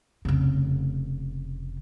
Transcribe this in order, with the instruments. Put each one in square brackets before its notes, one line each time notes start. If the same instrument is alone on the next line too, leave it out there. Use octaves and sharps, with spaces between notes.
[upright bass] F1 C#3